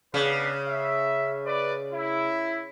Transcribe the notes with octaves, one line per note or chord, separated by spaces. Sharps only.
C#3 B3 D4 B4
E5
B4 D5
E4